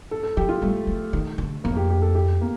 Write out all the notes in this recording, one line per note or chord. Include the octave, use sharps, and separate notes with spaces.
A4
A4
F3 G4
F4
G3 A3
F3
D#3
D3
F2 A#3
G4
G4
A4
G4
A#3